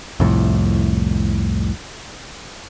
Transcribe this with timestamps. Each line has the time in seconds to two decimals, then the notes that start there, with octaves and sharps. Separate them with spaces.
0.20 C2 F2 A2